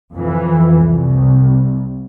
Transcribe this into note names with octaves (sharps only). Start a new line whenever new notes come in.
F2 E3
C2